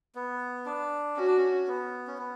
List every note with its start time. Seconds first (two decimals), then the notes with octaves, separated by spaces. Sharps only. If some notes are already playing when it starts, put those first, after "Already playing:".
0.15 B3
0.66 D4
1.16 C#4 F#4
1.27 D4
1.38 C#4
1.67 B3
2.07 C#4
2.18 B3